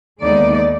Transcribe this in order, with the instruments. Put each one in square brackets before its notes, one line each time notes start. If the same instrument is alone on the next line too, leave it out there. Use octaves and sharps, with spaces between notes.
[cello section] D#2 D3 G#3 B3 D#4 D5